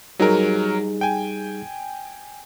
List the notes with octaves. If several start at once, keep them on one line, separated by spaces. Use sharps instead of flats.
F#3 G3 D#4 G#4 A#4
G5 G#5